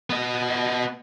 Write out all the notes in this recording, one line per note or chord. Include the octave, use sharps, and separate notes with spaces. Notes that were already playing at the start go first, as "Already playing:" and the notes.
B3 D#5